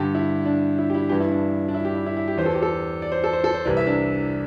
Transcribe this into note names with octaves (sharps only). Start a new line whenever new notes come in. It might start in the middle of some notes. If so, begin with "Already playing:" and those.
Already playing: G2 D3 G4
E4
D4
E4
G4
E4
G2 E3 G4
E4
D4
D4
E4
G4
E4
E4
E4
G4
E2 E3 C5
A4
G4
A4
D5
C5
A4
C5
A4
C5
C2 C3 E3 D5
E5
D4